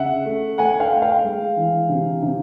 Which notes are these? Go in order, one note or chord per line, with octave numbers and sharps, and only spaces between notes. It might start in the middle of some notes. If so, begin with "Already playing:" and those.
Already playing: C#3 E5 F#5
A3
A3 F#5 G#5
F5 G5
A3
F5 G5
G#3
E3
C3
C3